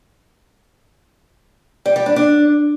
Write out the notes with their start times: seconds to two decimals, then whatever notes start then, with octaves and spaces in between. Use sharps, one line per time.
1.86 G3
1.96 G3
2.06 D4
2.16 D4